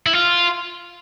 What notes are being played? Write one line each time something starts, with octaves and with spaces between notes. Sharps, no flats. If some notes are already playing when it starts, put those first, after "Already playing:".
E4
F4